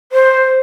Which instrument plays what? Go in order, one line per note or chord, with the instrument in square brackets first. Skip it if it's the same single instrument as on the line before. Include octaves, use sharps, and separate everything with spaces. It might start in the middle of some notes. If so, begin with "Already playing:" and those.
[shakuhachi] C5